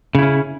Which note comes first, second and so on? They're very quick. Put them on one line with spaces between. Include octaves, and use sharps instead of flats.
C#3 E4 C#4